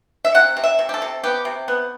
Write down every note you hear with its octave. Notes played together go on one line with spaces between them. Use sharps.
E5
C3 F#5
C3
E5
C3
G4
A4
C3
B3 G4
C3
B3